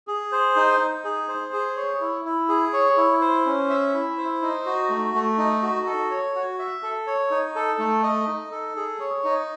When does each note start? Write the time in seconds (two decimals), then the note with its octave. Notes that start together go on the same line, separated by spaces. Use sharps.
0.08 G#4
0.32 C5
0.56 D#4
0.80 D#4
1.04 G#4
1.28 C5
1.53 G#4
1.77 C#5
2.01 E4
2.25 E4
2.49 G#4
2.73 C#5
2.97 E4
3.21 C5
3.46 C#4
3.69 E5
3.94 E4
4.18 C5
4.42 D#4
4.66 F#4
4.90 A3
5.14 A3
5.38 D#4
5.62 F#4
5.87 A4
6.11 C#5
6.35 F#4
6.59 E5
6.83 A4
7.07 C#5
7.31 D#4
7.56 A4
7.79 A3
8.03 D#5
8.28 D#4
8.52 A4
8.76 G#4
9.00 C#5
9.24 D#4